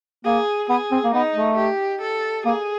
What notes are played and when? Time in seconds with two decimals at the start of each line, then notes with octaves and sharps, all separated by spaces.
0.24 A#3 G#4
0.69 B3 G#4
0.91 C4
1.04 A#3
1.14 B3 D#4
1.35 A3
1.57 G4
2.01 A4
2.45 A#3 G#4